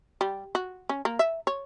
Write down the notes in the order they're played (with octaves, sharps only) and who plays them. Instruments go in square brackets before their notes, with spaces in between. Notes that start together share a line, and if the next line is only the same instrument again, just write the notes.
[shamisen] G3
F#4
C#4
A#3
E5
C#5